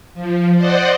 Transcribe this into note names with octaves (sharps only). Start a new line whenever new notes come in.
F3
C5 D5 D#5 F#5